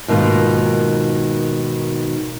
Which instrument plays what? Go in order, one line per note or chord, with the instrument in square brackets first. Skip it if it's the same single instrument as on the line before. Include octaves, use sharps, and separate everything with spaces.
[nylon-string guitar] G#2 B2 D#3 G3 A#3 F4